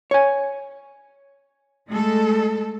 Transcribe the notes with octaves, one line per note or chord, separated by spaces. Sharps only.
C#5 G#5
G#3 A3 A4